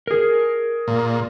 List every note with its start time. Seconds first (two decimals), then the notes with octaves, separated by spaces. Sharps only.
0.07 G#4 A#4
0.88 A#2